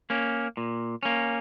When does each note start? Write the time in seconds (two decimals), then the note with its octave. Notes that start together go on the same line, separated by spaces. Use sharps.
0.10 A#3 C#4
0.57 A#2
1.03 A#3 C#4